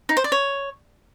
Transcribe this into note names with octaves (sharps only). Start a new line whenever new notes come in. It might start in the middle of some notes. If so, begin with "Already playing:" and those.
D#4
C5
D5
C#5